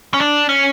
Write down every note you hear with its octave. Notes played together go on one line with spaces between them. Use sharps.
C#4
D4
C#4